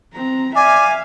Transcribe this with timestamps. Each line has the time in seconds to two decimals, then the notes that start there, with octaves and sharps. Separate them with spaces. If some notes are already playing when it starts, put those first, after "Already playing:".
0.14 C4 A#5
0.55 D5 E5 F5 G#5